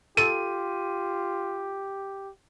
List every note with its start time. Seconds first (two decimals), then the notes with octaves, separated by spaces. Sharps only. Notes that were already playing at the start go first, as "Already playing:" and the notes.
0.17 F4 G4 A4 D#7